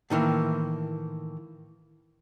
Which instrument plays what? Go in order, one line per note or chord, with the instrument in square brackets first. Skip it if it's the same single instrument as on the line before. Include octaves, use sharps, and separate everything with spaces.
[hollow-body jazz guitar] A2 D#3 E3 A#3